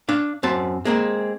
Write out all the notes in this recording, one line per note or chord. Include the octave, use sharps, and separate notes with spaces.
D4 F5
F#2 C4 A5
G#3 A#3 C4